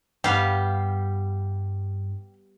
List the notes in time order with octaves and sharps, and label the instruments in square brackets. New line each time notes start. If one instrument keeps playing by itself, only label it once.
[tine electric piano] G2 [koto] G3 B3 F5 [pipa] G4